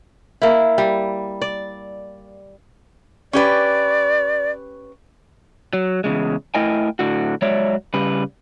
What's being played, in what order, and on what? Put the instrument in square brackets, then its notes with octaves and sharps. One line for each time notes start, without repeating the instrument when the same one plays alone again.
[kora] A#3 E4
G3
D5
[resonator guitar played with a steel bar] C#4 G4 B4 [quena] D5
[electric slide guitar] F#3
E2 G2 C#3 G#3
A3 E4 A#4 D#5 G5 G#5
A2 D3 F#4
F#3 G#3 C#5 D5 E5
C#3 G3 B4